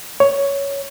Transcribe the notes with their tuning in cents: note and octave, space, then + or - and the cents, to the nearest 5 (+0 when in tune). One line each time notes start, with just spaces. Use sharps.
C#5 +10